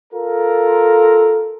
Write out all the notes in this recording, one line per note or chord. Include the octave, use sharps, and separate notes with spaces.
F4 A4 A#4